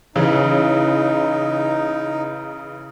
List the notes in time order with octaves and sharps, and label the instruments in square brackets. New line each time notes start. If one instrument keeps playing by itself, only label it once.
[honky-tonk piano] C#3 E3 [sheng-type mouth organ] D#4